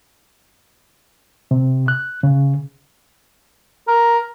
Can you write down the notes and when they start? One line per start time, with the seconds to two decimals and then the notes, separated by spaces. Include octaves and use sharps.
1.51 C3
1.88 F#6
2.23 C#3
3.88 A#4